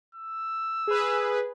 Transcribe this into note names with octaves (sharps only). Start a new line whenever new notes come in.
E6
G#4 B4